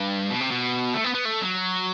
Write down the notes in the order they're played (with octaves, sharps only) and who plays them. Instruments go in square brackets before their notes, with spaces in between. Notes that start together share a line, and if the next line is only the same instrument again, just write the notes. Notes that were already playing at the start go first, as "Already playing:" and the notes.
Already playing: [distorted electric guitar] G2
B2
C3
B2
A3
B3
B3
A3
F#3